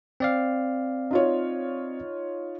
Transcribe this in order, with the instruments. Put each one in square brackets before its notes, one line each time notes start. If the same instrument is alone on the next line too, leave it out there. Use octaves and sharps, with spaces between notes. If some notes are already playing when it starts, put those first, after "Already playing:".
[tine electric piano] C4 D5 F5
[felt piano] D#4 F4 C#5